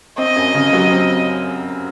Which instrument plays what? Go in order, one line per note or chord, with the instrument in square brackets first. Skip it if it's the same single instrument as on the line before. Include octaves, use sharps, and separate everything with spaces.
[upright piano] C4 [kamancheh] D#5
[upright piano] F#2
C#3
F#3
C4